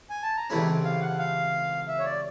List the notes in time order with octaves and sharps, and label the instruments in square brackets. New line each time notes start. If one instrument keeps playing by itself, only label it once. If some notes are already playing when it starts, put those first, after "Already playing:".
[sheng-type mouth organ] G#5
A5
A#5
[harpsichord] C#2 C3 E3 A3 C#4 [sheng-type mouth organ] B5
[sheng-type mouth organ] F5
F#5
F5
E5
C#5
D5